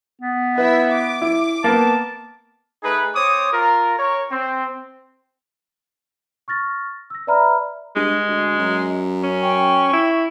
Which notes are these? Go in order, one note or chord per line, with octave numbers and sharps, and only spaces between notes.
B3
E4 B4 E5
D6
E4
A#3 B3 A5
A3 D#4 G#4 B4
C4 C5 C#5 D6 D#6
F4 A#4
A#4 C#5
C4
C#6 F6 A6 A#6
E6 A#6
B4 D5 E5 A#5 B5 F6
G2 G#3
D2
F#2
C#4
G5 C#6
E4